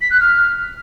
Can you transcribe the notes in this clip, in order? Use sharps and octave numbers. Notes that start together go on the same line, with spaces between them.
B6
F#6
F6